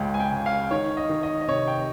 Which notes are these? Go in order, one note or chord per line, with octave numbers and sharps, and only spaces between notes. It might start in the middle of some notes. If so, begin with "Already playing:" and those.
Already playing: C#2 C#3 G#3 G5
G#5
G5
C#2
F5
D#3 C#5
D#5
D#3
D#5
D#5
C3 C#5
G5